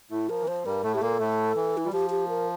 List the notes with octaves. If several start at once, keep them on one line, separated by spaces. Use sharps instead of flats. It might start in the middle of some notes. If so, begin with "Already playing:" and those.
A2 A3 E4
F3 A#4
E3
F3 C5
G2 G3 A#4
A2 A3 A4
A3 G4
A#2 A#3 A4
A2 A3
E3
E4
G3 F4
F3 G4
G4
A#4